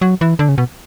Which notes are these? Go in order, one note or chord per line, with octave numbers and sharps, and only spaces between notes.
F#3
E3
D3
C#3
B2